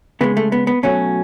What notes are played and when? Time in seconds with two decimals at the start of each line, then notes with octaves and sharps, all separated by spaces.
0.21 C#3 G#3 B3
0.37 A3
0.52 B3
0.67 B3
0.83 B2 F#3 A3 C#4